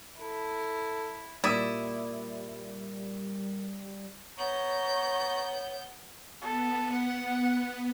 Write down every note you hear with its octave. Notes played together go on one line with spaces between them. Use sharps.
E4 A4
A#2 G3 A#3 E4 D5 D#6 E6
B3 C#5 A#5 C#6 G6
B3 A4
F#5